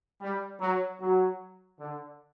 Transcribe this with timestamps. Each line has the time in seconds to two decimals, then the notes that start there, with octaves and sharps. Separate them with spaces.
0.21 G3
0.61 F#3
1.01 F#3
1.80 D3